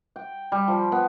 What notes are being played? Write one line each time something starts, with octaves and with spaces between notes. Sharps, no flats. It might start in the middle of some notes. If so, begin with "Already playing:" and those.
G5
G3
F3
B3